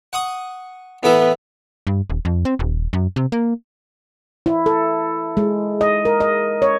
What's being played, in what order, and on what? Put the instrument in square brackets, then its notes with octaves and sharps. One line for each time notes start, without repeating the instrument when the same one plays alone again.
[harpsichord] F#5 C#6 D#6
[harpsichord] A2 E3 A4 [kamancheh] B3
[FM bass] G2
D#1
F2
C4
D#1
F#2
C3
A#3
[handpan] E4
A4
G#3
D#5
A#4
D#5
C#5